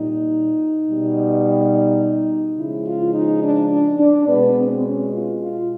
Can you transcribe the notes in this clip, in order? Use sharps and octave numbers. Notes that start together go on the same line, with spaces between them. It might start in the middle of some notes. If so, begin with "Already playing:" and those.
Already playing: A#2 G3 D#4
B2 G3
C#3 F3 G#3 E4
F4
D#4
D4
D4
D4
B2 G#3 B3
C4
C#4
F4
F4